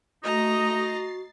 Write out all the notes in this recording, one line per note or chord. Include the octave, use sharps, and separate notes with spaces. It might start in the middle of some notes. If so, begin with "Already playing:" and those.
A3 D#4 F#4 D#5 A#5
A6 C7